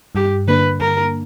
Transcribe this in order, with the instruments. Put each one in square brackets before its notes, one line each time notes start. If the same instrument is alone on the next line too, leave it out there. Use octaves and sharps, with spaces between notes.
[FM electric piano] G2 [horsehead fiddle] G4
[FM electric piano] D3 A#3 D4 [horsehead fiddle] B4
[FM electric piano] G2 [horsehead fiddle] A#4